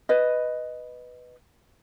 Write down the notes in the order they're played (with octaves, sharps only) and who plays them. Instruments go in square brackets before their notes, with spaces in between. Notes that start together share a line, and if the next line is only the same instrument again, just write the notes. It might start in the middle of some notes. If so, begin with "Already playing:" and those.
[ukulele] B4 D#5